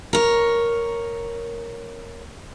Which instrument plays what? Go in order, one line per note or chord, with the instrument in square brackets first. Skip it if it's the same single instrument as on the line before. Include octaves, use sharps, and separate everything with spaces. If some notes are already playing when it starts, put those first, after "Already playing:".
[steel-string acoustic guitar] A#4 C#5